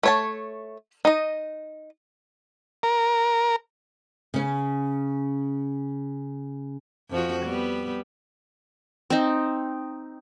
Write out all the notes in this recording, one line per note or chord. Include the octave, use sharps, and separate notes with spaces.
A3 C#5 A5
D#4 D#5
A#4
C#3 C#4
F2 F3 F#4
G3 B3
C4 D#4